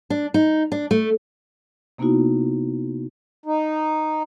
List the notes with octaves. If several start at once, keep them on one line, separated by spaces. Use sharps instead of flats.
D4
D#4
D4
A3
C3 A#3 B3 D#4 E4 F#4
D#4